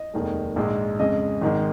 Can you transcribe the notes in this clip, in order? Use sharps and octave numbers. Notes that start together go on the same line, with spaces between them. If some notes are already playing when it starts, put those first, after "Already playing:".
Already playing: D#5
F1 D#2 D#3 G#3
A#1 G#2 G#3
F2 C#3 G#3 D#5
G#1 G#2 D#3 G#3